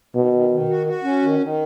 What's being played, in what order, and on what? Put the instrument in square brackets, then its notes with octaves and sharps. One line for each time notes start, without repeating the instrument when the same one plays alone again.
[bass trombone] B2 [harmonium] D#3
[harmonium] D#3
D#3
F#4
F#4
C#4
D#3
D#3